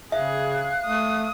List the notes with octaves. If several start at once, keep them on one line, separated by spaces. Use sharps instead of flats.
C#3 G#4 E5 F5 F#6
A3 D#6